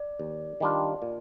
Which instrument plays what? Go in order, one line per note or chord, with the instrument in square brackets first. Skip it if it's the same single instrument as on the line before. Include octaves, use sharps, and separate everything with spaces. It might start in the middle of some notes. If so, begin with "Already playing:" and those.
Already playing: [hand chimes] D5
[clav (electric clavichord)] D#2
D#3 G3 D4 F4
A#2